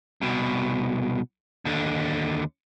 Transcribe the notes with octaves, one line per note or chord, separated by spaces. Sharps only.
C2 B2
D#2 D3